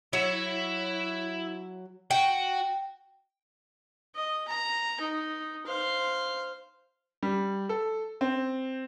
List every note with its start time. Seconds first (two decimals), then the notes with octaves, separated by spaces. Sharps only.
0.13 F#3 E4 C#5 E5
2.11 F#4 G5
4.15 D#5
4.48 A#5
5.00 D#4
5.66 C5 F5
7.23 G3
7.69 A4
8.21 C4